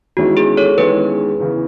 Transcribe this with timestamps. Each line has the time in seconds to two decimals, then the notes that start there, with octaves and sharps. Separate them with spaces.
0.17 E2 D#3 G#3 C#4 E4 F#4
0.37 G#4
0.57 A4 C#5
0.78 E2 D#3 G#3 C#4 E4 G#4 B4
1.40 E2 C#3 E3